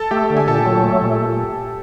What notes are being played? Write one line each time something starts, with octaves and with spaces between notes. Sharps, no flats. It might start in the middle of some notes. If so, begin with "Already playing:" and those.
Already playing: A4 A5
A3 G4 G5
D3
G#5
A#2 A4 A5
F#3
A3
A#2